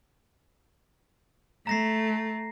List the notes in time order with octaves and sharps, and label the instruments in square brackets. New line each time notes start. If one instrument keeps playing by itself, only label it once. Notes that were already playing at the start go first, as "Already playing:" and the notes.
[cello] A3 [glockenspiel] A#5 A#6 C7